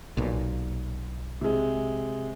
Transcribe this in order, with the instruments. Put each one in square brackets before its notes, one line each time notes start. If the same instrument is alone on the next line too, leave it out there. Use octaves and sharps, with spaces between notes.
[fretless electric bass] B1 A#2
[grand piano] C3 G#3